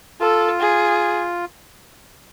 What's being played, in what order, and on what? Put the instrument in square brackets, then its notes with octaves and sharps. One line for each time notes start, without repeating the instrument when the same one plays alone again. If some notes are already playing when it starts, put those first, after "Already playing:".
[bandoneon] F4 [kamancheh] A4
[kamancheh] G#4